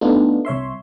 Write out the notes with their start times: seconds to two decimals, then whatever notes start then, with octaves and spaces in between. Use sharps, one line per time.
0.01 A3 B3 D4 D#4 F4
0.45 C2 C#5 E5 C6